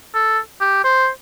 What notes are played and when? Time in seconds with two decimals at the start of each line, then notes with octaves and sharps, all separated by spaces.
0.14 A4
0.61 G4
0.84 C5